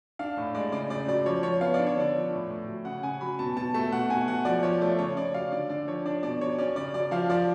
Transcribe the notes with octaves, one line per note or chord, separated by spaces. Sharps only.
D4 F5
A2
G#3 D5
C#3 D5
C#3 D5
F#3 D5
F3 C#5
F3 C#5
B3 F5
D5
D4
C#5
D3 D5
F3
A2
A2
F#3
C#3 F#5
C#3 G#5
F#3 B5
B2 A5
B2 A5
A3 A5
B2 F#5
B2 G#5
F#3 F#5
F3 D5
F3 C#5
A3 D5
C#3 C#5
C#3 D5
F#3 F5
D3 D5
D3 D5
F3 C#5
D4 D5
B2 D5
F#3 C#5
C#4 D5
C#3 D5
F#3 D5
F3 F5
F3 D5